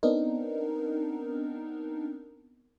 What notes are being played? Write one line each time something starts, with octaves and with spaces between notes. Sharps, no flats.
B3 C4 D4 D#4 A#4